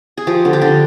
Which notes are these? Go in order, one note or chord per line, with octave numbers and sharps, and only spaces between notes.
G#4
F3 G4
D3
G4
D3